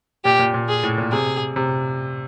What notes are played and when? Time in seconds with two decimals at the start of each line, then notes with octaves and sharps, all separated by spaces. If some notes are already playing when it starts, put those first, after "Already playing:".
0.25 A#2 G4
0.39 A#2
0.54 A#2
0.69 G#4
0.83 A2
0.98 A#2
1.12 C3 G#4
1.56 C3